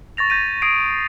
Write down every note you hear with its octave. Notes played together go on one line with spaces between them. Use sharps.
C#6 A6 A#6 F7
G6 A#6 B6 D#7
D#6 G#6 A#6 C7 D7